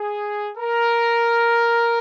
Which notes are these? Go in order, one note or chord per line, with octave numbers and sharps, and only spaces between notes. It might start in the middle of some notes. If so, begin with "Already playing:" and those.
Already playing: G#4
A#4